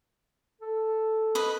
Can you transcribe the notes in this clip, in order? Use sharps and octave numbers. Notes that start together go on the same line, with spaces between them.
A4
B4 D#5